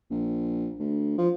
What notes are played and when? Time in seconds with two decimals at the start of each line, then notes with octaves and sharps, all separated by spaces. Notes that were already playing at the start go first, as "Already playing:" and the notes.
0.11 A#1
0.80 D2
1.18 F3